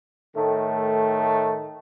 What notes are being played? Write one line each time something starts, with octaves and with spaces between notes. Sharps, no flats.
A2 D#3 A3